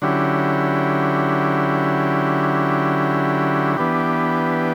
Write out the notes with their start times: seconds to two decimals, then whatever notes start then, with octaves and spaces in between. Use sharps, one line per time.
0.02 D3 F#3 C#4 E4 G4
3.77 E3 B3 D4 G4